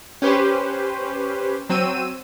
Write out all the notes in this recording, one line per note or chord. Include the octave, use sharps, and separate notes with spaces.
C#4 G4 B4 C5
F#3 C4 E6 D#7